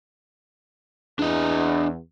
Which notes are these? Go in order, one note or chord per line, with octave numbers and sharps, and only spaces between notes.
E2 D4 D#5